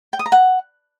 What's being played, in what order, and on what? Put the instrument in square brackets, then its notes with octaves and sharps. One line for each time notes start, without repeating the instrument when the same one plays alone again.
[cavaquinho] G5
D#6
A#5
F#5